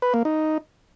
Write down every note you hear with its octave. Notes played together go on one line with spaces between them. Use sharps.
B4
A#3
D#4